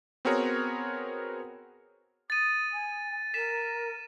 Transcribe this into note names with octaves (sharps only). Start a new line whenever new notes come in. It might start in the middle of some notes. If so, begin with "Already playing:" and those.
B3 C4 F#4 G#4 A#4 C#5
D#6 A6 D#7
G#5
A#4 B6 E7